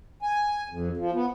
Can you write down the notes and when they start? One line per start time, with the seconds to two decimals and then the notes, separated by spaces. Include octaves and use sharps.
0.22 G#5
0.69 F2
0.97 F3
1.13 B3